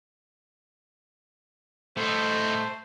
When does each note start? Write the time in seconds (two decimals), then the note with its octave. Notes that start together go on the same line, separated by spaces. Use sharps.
1.97 A2 A3 D#4 C5